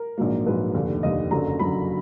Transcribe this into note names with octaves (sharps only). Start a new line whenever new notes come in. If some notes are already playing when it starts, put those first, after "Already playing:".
Already playing: A#4
A#1 G#2 F#3 A#3
A#1 G#2 F#3 A#3 B4
F1 D#2 D3
F1 D#2 D3 D#5
F#1 F#2 D3 F#3 A#5
F#1 F#2 D3 F#3 B5